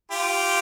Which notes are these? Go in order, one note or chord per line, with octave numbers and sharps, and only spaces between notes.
F4 G4